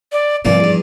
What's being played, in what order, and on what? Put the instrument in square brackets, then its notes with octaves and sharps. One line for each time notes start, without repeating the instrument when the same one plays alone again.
[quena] D5
[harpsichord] C2 E3 A#3 [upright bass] G#2 F3 [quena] D5
[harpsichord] E2 G2